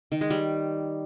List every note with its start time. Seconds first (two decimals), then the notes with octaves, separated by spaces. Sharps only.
0.12 D#3
0.21 G#3
0.30 G3